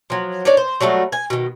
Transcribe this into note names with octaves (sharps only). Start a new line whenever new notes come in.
F3 F#3
D4 D#4 C#5 D5
C5
F#3 G3 A3 F#4
G#5
B2 D#3